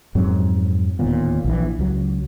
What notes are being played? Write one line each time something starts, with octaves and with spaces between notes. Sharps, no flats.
F2 G#2 F#3 C4
D1 D#2 A#2 B3
A#1 E3
C#2 F#3